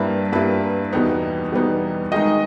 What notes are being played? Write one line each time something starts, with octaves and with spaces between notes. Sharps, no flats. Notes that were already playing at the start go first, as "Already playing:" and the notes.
Already playing: G2 G3 A#3 E4 B4
G2 G3 A#3 E4 B4
E2 B2 G3 B3 D#4
E2 B2 G3 B3 D#4
D#3 G#3 D#4 D#5